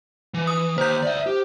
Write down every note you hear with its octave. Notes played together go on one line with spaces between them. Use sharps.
E3
D#6
D#2 C5 G6
D5 E5
G4